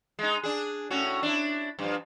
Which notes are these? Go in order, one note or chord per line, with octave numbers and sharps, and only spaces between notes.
G#3 D#4
D4 G#4
A2 C#4 F#4
D4 E4
G2 F3